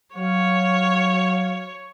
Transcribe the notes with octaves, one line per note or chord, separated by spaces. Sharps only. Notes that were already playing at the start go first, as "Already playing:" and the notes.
F#3 C#5 F5